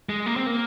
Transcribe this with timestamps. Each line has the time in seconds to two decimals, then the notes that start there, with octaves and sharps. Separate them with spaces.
0.09 G#3
0.26 A#3
0.36 C4
0.46 A#3